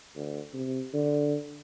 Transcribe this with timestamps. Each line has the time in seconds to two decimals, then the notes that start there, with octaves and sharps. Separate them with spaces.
0.16 D2
0.54 C3
0.93 D3